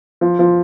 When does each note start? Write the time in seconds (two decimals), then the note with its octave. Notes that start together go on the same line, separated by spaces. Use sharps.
0.21 F3
0.39 F3